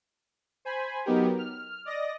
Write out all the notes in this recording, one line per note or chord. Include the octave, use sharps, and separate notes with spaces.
C5 G#5 B5
F#3 B3 D#4 G4 A#4
F6
D5 D#5 D#6 A#6